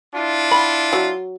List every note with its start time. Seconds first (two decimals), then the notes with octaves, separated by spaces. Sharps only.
0.14 D4 E4 F4
0.51 F#5 B5
0.93 F#3